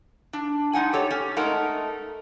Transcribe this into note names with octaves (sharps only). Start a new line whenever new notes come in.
D4
G#3 D#4 F#5 G#5
G4 A4 C#5
C#4
G#3 A3 D#4 A#4 F#5 A5